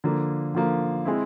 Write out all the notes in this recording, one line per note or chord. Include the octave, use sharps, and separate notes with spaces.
D3 F3 A#3
D3 F3 A#3
G#3 C4 E4